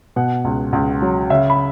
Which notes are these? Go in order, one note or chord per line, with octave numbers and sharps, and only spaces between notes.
B2 F#5
C#2
C#2
F#3
C#3 E5
B5